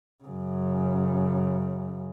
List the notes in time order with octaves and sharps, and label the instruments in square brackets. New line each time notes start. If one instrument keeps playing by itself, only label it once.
[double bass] F#2 C#3